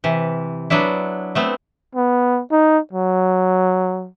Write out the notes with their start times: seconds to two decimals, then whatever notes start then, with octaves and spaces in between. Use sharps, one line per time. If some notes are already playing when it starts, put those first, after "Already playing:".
0.04 C3 E3
0.70 F#3 B3 D4 E4
1.35 A3 B3 C4
1.95 B3
2.52 D#4
2.93 F#3